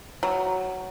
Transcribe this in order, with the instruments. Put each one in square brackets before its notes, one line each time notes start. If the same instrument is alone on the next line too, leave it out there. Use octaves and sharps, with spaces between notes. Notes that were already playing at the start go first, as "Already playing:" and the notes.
[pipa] F#3